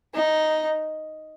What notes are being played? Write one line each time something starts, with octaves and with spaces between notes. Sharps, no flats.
D#4